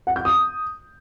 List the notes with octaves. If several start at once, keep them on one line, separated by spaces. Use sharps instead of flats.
F#5
G6
D#6